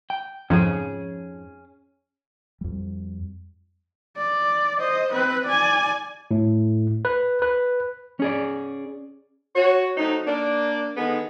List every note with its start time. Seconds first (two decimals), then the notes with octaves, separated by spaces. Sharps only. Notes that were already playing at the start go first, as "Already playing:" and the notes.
0.10 G5
0.50 F2 G#2 F3 C#4 G#4
2.61 F2 G3
4.16 D5
4.80 C5 D#5
5.12 C4 B4
5.45 D5 G#5
6.31 A2
7.05 B4
7.42 B4
8.20 C#4 G#4 D5
9.55 F#4 C#5
9.96 F#3 A3 C4 D#4
10.25 A#3 D4 D5
10.96 D3 D#3 G#3 B3 D#4 G#4